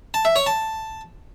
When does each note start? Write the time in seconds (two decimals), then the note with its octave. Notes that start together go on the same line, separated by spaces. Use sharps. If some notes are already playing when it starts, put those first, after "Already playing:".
0.14 A5
0.25 E5
0.36 C#5
0.46 A5